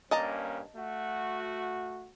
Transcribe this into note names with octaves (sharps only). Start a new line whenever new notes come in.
G2 A#3 C#4 D#5 A5 A#5
A3 F#4